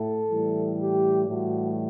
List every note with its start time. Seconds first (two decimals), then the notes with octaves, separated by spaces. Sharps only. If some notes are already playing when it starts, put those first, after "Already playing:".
Already playing: A2 A4
0.28 A2 E3 G3
0.78 G4
1.28 A2 E3 G3 F#4